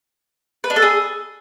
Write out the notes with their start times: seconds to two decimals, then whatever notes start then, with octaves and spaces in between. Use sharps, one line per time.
0.64 B4
0.70 D4
0.76 A4
0.82 G#4